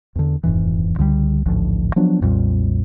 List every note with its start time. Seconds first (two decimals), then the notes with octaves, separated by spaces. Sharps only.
0.15 E2 D3
0.43 D#1 F2 G#2 E3
0.98 C#2 D3 F3 G3
1.46 A1 D2 G#2 F3
1.96 F3 F#3 B3 D4
2.21 B1 F2 A#2 G3